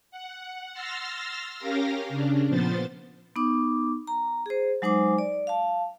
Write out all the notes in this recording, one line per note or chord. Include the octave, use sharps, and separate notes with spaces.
F#5
C6 E6 F6 A6 A#6
C#4 G4 A#4 F5 A#6
C#3 D4
A#2 F3 B3 C5 A6
B3 D#4 D6
A#5
G#4 C5
F#3 G#3 D#4 C5 G#5 D6
D5
F5 A5